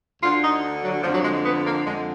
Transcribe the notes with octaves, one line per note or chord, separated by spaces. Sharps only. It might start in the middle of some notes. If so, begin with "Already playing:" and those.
D2 D3 F4
D#4
F#3
F2 D3 F3
F#3
G#3
B3
A#3
F2 D3 G#3